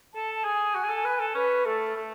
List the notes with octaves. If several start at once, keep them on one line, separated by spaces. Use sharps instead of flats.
A4 A5
A5
G#4 G#5
F#4
G#4
A4
B4
A4
C#4 B4
A3 A4
A3